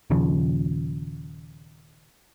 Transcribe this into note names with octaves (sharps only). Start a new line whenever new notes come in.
D#1 D#2 C#3 F3